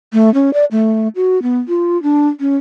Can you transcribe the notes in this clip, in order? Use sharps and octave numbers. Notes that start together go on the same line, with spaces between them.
A3
C#4
D5
A3
F#4
B3
F4
D4
C#4